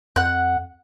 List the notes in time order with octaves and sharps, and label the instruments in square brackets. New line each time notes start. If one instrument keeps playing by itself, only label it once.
[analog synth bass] F2 [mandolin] F#5 F#6